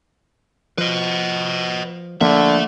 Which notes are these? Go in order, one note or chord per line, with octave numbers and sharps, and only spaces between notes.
F3 B4 D#5
D3 F3 A3 A#3 E5